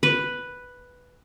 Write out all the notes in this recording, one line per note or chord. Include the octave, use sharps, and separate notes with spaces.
B4